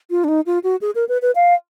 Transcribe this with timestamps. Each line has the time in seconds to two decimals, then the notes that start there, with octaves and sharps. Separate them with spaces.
0.11 F4
0.24 D4
0.28 D#4
0.46 F4
0.64 F#4
0.81 G#4
0.95 A#4
1.09 B4
1.22 B4
1.35 F5